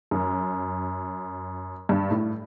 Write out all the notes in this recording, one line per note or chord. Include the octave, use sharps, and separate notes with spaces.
F#2
G2
A2